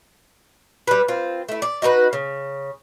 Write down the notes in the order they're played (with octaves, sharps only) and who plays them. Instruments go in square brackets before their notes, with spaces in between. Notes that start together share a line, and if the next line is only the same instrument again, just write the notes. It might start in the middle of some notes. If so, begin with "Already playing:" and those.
[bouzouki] G3 B4
C4 F4
A3 E4
D5
D#4 F#4 A#4 B4
C#3